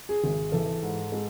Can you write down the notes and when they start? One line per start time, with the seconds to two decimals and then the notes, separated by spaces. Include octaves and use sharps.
0.09 G#4
0.24 G#1
0.52 E3 A4
0.82 G#2
1.12 G#3